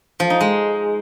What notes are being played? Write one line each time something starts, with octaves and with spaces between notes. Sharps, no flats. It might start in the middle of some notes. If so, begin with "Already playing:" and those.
F3
D#4
G#3